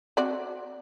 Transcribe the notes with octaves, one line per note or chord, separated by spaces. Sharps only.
C4 F#4 D5